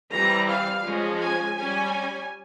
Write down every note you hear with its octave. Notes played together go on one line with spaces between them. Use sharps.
E3 G3 C4 A#5
F5
F3 G#3 C#4
G#5
G3 C#4 G#5